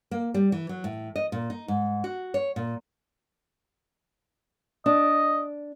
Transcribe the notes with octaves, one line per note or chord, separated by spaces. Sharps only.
A#3
G3
E3
F#3
A2
D#5
A#2
D#4
G#2
F#4
C#5
A#2
D4 D#5